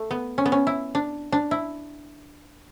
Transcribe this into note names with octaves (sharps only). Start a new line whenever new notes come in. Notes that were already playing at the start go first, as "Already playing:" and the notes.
Already playing: A3
B3
C#4
B3
C#4
E4
D4
D4
E4